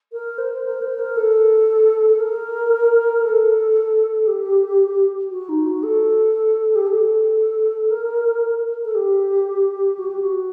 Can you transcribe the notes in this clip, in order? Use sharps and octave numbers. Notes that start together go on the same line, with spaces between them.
A#4
C5
A#4
C5
A#4
A4
A4
A#4
A4
G4
F#4
D#4
F#4
A4
G4
A4
A#4
A4
G4
F#4
G4
F#4